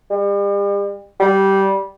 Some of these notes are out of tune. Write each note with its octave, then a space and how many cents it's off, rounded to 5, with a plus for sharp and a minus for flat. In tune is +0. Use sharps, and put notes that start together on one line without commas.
G3 +40
G3 -10